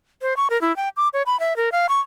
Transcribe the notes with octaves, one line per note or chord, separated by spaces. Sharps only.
C5
C#6
A#4
E4
G5
D6
C#5
B5
E5
A#4
F5
C#6